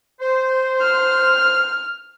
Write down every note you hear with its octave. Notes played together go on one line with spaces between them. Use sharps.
C5
F6